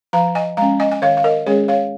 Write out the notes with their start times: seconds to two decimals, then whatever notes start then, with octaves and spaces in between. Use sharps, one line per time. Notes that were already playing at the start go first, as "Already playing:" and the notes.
0.13 F3 F5 A#5
0.35 D#5 G#5
0.57 G#3 C#4 F5 A#5
0.80 D#5 G#5
0.91 G#5
1.02 D#3 C#5 F5
1.17 F5
1.24 A#4 D#5
1.46 G#3 C#4 G#4 C#5
1.68 C#5 F5